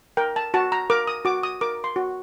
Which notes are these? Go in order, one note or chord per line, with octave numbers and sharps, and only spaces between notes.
A#4 G5
A5
F#4 A5
A#5
A#4 D6
D#6
F#4 D6
D#6
A#4 D6
C6
F#4